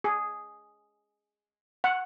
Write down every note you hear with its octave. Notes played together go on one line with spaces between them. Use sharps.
G#4
F#5